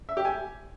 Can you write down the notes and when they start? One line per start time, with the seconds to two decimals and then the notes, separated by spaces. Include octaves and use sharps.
0.09 E5
0.17 G4
0.25 G#5